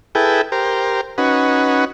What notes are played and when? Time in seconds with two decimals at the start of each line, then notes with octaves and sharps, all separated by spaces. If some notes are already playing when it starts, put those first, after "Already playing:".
0.15 E4 G#4 A4 B4 G5
0.52 G4 A#4 C5
1.18 C#4 D#4 F#4 B4